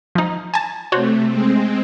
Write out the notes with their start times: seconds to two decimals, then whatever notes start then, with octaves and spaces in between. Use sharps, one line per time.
0.15 F3 D#4
0.54 G#5 A5
0.92 C3 A3 F#4 C5 C#5
1.27 G#3 C4